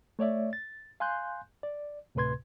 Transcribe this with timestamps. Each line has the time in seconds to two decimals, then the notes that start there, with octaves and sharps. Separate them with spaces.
0.19 A3 C#5 D5 E5
0.53 A6
1.00 F5 G#5 C6 F#6 G6
1.63 D5
2.15 D2 A2 C3 B4 C6 G#6